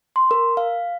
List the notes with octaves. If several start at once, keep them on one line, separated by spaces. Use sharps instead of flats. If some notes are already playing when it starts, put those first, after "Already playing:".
C6
A#4
F5